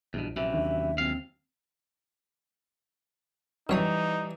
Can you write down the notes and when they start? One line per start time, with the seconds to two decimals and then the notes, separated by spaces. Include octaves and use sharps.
0.14 A#1 E2 G2 B2
0.36 F#2 C3 E3 E5
0.54 D#2 D#3 D4
0.98 C#2 F#2 C4 F5
3.69 F#2 E3 G3 D#4 C#5 A#5 D#6